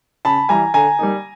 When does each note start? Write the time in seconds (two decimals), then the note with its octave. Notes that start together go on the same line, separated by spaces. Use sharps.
0.25 C#3 A5 B5
0.49 E3 G3 G#5 A#5
0.74 D3 G#5 A#5
0.99 G3 A#3 D#4